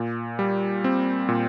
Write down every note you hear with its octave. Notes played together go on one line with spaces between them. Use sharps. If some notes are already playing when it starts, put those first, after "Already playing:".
Already playing: A#2
G3
C4
A#2